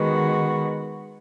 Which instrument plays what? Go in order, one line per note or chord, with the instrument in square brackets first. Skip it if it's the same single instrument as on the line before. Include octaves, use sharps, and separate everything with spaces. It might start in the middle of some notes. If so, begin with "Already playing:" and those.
Already playing: [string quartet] D#3 G#3 B3 F#4